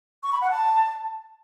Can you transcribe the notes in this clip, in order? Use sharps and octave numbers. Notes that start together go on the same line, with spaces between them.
C#6
B5
F#5
A5